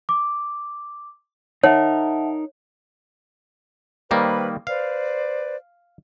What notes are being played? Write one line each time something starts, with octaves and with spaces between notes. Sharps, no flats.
D6
D#4 A#4 C#5 E5 F#5 A5
D#3 G3 A#3 B4 C5 B5
B4 C5 D5 F5